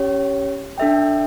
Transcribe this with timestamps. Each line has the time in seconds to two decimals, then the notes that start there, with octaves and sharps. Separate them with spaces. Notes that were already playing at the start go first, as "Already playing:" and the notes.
Already playing: C#4 G4 C#5
0.78 D4 A4 E5 G5